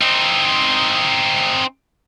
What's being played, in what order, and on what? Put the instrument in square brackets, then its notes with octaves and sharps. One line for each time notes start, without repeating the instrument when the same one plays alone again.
[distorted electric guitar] C4 D#4